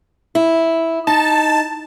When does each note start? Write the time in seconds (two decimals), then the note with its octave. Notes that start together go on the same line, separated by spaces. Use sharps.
0.35 E4
1.07 D#4 A5